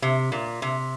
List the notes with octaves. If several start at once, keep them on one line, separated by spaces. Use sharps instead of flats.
C3
A#2
C3